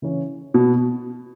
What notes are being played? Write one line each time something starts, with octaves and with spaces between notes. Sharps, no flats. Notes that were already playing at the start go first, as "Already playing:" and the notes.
C#3 E3 C#4
B2 B3